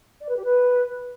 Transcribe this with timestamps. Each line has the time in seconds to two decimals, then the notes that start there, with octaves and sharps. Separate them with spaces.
0.21 D5
0.28 B4
0.36 G4
0.44 B4